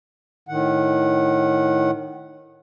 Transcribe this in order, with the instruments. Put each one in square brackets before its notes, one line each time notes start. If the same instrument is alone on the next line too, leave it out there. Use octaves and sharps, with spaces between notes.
[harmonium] A2 D#3 F#5